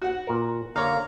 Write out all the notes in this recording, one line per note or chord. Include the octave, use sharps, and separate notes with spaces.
F#4 F#5
A#2 A#4
D3 A#3 C#5 F5 A#5